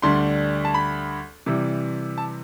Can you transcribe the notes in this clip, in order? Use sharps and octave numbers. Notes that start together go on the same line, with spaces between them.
D2 D3 G3 D4 C6
A5
B5
C3 E3 G3
A5